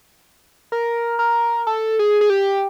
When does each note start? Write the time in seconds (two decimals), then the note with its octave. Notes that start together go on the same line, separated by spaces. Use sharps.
0.72 A#4
1.19 A#4
1.67 A4
1.99 G#4
2.21 G#4
2.30 G4